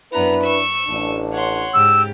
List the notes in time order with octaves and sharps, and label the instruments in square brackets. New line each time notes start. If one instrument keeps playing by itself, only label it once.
[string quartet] F#2 B3 A#5 [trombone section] D4 E4 B4
[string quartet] C#6 E6
[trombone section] A1 D4
[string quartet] C#5 F#5 C6
[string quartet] G#2 C#3 G4 [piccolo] E6